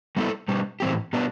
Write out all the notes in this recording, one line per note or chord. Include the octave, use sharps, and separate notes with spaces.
G3 B3 E4 A4
B2 G3 D4
A2 E3 G3 C4 G4
B2 G3 B3 D4